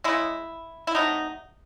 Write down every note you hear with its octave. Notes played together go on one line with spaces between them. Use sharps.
C#3 G#3 E4
E4
C3 F#3 A3 D#4